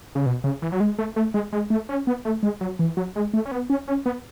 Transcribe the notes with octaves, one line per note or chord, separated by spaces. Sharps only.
C#3
B2
C#3
E3
F#3
G#3
A3
A3
G#3
G#3
A3
C#4
B3
A3
G#3
F#3
E3
F#3
G#3
A3
C#4
B3
C#4
C#4
B3